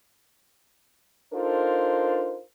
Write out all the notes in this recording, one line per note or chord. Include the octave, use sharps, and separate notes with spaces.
D4 D#4 F4 A4 A#4 C5